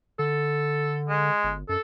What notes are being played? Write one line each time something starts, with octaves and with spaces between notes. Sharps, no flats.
D3 A4
G#3
G1
F#2 A4